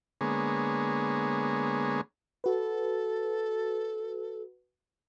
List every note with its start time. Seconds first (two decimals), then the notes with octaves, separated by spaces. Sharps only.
0.21 D3 G#3 A#3 B3 G#4 C#5
2.44 F#4 A4 B4